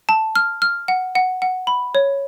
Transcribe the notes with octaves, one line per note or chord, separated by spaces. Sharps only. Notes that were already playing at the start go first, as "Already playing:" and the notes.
A5
F6
F6
F#5
F#5
F#5
B5
C#5